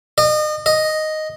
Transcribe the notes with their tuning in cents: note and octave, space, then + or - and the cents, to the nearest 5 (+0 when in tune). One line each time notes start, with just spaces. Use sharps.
D#5 -35
D#5 +0